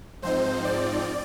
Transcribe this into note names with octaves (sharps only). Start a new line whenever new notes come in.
G#2 F3 C4 D#4 C5
D5